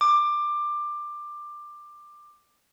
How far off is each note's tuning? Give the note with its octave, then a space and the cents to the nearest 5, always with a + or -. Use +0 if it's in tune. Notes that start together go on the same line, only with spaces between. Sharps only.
D6 +20